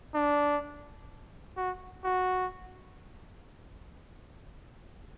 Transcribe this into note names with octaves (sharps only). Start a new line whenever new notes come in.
D4
F#4
F#4